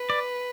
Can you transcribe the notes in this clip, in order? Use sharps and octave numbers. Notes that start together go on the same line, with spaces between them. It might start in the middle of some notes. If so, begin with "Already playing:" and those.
Already playing: B4
D5